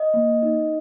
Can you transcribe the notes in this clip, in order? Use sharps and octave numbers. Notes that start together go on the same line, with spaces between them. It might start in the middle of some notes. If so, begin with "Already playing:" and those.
Already playing: D#5
A#3
D#4